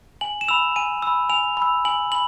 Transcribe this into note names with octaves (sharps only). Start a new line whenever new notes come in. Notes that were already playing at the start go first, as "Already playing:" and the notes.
G#5 F#7
E7
B5 E6 F7
G#5 D#7
B5 E6
G#5 F7
B5 E6
G#5 F#7
B5 F#7